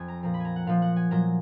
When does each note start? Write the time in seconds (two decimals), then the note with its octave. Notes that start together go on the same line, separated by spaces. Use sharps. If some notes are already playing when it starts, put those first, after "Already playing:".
Already playing: F2 G#5
0.08 A#5
0.23 A#2 F3 A#5
0.34 B5
0.40 G#5 A#5
0.56 F#5
0.67 A#2 F3 F5
0.82 F#5
0.96 G#5
1.11 A#2 F#3 A#5